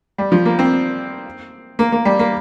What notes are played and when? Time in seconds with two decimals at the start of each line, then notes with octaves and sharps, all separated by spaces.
0.18 G3
0.32 F3
0.45 A#3
0.59 C4
1.79 A#3
1.92 A#3
2.05 G3
2.19 A#3